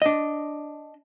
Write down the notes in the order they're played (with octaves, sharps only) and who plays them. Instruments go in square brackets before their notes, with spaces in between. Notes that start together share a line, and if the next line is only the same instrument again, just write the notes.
[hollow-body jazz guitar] D4 D#5